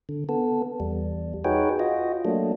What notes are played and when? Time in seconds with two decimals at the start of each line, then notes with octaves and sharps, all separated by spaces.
0.09 D3
0.29 B3 A4
0.80 E2 G3
1.45 D#4 F#4 G#4 B4 C#5 G5
1.79 F4 F#4 D#5
2.25 F#3 A3 A#3 D4